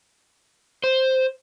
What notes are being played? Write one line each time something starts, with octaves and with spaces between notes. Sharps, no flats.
C5